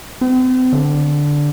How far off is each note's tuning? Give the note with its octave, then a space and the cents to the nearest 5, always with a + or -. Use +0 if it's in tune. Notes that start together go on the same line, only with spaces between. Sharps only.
C4 -40
D3 -5